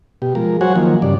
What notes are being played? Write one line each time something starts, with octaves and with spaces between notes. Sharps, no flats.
B2 G4
F3 G#3 A#4
F#3 F#4 C5 C#5 F#5 G#5
D#3 F3 F#3 A#3
G2 C#3 D5